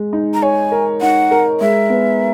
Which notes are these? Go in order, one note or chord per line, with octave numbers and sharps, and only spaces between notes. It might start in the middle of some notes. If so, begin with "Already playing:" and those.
Already playing: G#3
D#4
A#5
C#5 G#5
A#4
D#4 F#5
A#4
G#3 E5
B3